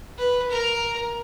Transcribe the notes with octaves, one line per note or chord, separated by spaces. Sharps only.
B4
A#4